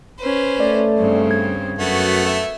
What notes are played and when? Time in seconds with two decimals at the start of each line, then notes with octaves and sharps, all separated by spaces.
0.19 C#4 B4 C5
0.60 A3 D5
0.96 G2 C#3 C4
1.31 G#6
1.79 F#2 A3 B3 F#4
2.26 E5